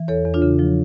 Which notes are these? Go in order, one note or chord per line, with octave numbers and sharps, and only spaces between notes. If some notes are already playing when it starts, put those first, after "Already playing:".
Already playing: E3
E2 A4 C#5
E2
D4 F4
C#3
F3